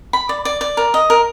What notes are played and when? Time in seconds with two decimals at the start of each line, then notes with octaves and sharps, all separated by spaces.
0.13 B5
0.29 D5
0.45 D5
0.61 D5
0.77 A#4
0.94 D#5
1.10 A#4